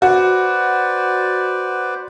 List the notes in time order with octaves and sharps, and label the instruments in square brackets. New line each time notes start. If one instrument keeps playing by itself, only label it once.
[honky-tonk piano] F#4 [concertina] B4 C5 D5